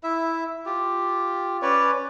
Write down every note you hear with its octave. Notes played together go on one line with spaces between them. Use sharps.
E4 E5
F4 G4
C#4 B4 C#5 D5